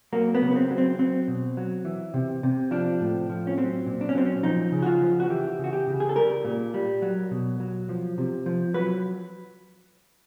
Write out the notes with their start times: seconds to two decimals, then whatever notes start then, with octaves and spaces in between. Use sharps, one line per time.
0.13 F#3 A#3
0.35 B3
0.42 C#3
0.51 B3
0.56 C4
0.71 F#3
0.78 C4
0.99 F#3 C4
1.28 B2
1.57 F#3
1.85 E3
2.14 C3
2.43 C3
2.71 F3 D4
3.01 A2
3.29 F3
3.47 C#4
3.57 F#3 C4
3.86 A#2
4.01 D4
4.09 C#4
4.15 F#3 C4
4.26 C#4
4.43 F3 D#4
4.72 C#3
4.82 F#4
4.86 F4
5.02 F3
5.20 F#4
5.30 E3 G4
5.59 C#3
5.64 F#4
5.73 G4
5.87 C#3
6.00 G#4
6.09 A4
6.16 G3 A#4
6.45 A#2
6.74 G3
7.02 F#3
7.31 B2
7.60 F#3
7.89 F3
8.18 C3
8.46 F3
8.74 F#3 B4